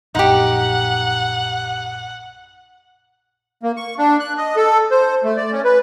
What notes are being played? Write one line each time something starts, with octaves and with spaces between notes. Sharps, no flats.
A#1 F#2 A#2 D#4 G4 F#5
A#3
C#6
D4
F#6
D#5
A4
C5
A3
D5
C#4
B4